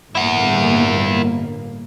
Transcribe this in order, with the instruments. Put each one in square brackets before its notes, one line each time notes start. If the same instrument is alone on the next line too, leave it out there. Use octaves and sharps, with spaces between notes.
[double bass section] G1 A2 A#3 [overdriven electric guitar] E4 F#5